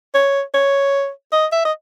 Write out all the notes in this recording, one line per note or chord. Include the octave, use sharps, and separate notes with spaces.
C#5
C#5
D#5
E5
D#5